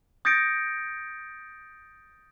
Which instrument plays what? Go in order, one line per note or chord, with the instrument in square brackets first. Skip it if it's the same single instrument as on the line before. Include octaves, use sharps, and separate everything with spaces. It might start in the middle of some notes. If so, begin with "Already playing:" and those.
[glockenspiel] D#6 G6 A6 A#6 C#7 D7